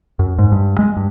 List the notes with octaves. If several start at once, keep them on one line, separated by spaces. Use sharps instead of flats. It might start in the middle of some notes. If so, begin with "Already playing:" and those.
F#2
G#2
G2
G#3
G2